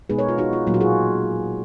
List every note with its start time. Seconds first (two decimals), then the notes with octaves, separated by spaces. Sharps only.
0.10 B2 G#3 B3 D#4 G#4 B4
0.18 A#4 C#5
0.29 F4
0.38 D#4 F#4
0.53 F4
0.67 A#2 F#3 A#3 F4
0.74 F#4
0.81 F4 G#4